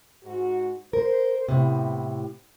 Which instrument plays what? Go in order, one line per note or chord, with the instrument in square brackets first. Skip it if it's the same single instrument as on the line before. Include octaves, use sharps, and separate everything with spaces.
[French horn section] G#2 F#4
[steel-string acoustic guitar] A#4 [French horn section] C5
[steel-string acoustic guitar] A2 C3 [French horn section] B3 E4